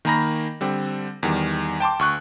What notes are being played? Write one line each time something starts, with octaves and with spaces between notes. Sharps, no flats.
D#3 A#3 G#5 A#5 B5 A#6
D3 G3 C4
E2 D#3 G3
G5 A5 C6 D6
D2 C#6 F#6